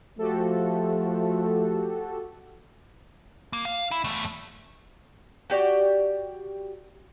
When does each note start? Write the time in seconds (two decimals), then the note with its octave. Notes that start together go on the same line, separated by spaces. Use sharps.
0.19 F3 A3 F#4 G4 A4
3.53 A#3
3.65 F5
3.91 E4
4.04 E2 A3
5.50 F#4 G4 D5